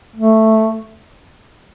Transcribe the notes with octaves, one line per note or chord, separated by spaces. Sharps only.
A3